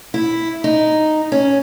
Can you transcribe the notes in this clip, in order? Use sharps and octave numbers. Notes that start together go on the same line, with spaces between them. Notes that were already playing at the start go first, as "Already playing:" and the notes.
E4
D#4
C#4